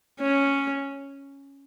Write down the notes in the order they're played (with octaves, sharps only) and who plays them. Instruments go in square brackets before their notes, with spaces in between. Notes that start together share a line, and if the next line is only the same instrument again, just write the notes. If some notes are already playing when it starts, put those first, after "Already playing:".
[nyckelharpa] C#4